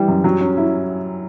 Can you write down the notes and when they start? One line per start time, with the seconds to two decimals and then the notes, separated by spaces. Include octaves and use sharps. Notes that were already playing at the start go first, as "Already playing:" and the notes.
Already playing: E3 G3
0.08 F#2
0.24 F#3
0.41 C#4
0.57 E4